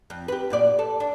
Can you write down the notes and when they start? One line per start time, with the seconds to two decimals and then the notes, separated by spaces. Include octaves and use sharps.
0.10 F2
0.28 G4 B4
0.50 F#2 A#2 D5
0.79 A4
1.00 D4